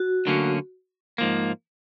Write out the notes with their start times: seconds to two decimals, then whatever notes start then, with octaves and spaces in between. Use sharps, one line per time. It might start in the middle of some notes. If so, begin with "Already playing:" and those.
Already playing: F#4
0.26 D2 D3 F#3 A#3 C#4
1.18 G#2 F3 A#3